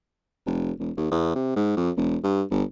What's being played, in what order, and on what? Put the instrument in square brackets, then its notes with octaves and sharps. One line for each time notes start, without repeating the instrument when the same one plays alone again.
[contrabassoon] F1
E1
D#2
E2
C3
G#2
F2
E1
G2
G1